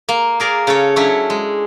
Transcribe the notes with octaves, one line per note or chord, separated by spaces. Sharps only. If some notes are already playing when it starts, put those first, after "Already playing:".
A#3
G#4 A#4 D5 F5
C#3 A4 C#5
F#3 C#4 D4 E4 C#5
G#3